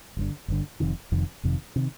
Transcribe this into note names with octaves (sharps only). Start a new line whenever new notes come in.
G1 G2 D3
G1 G2 D3
F1 F2 C3 D#3
F1 F2 C3 D#3
F1 F2 C3 D#3
C3 D#3